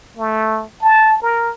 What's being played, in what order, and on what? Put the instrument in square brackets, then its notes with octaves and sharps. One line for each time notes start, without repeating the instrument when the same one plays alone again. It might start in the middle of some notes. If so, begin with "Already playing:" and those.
[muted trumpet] A3
A5
A#4